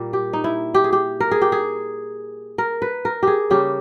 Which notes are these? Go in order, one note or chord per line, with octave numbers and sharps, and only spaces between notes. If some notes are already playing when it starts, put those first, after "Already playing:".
Already playing: A#2 G3 A#3
G4
D#4
E4
G4
G#4
G4
A#4
G#4
G4
G#4
A#4
B4
A#4
G4 G#4
C#3 G3 A#3 G4